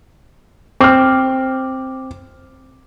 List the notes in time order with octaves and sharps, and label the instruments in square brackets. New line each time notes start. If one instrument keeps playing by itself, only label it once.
[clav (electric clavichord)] C4 [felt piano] D6 F6